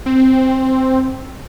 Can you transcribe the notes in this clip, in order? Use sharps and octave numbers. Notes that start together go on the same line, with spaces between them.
C4